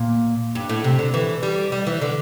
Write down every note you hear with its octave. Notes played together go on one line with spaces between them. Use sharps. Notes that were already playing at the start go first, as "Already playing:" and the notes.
Already playing: A#2
G2
A2
C3
D3
E3
G3
G3
E3
D3